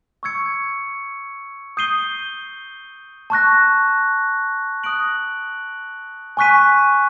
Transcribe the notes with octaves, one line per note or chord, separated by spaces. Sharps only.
C#6 E6 G#6 C#7
D#6 G6 C7 D#7 G7
A5 C#6 F#6 A#6
D#6 F#6 A#6 D7 F#7
G#5 C#6 F#6 B6 D#7